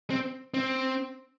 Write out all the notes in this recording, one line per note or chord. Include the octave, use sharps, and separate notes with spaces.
C4
C4